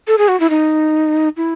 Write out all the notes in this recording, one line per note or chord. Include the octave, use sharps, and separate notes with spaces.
A4
G#4
F#4
E4
D#4
E4